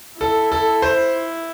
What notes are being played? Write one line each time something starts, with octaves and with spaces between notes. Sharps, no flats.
E4 A4
A4
C5